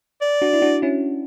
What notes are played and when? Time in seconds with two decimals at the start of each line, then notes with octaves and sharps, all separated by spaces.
0.21 D5
0.42 D4 F#4
0.53 E4
0.62 D4 F#4
0.82 C#4 E4